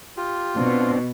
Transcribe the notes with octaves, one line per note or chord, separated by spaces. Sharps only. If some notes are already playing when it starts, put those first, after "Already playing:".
F4 G4
B2 C4 D4